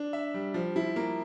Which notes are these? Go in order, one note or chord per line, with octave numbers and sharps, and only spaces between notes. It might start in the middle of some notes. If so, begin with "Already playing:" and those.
Already playing: D4
E5
G3
F3
E4
A#3